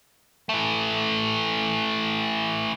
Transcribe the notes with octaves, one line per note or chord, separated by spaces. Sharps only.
E3 A3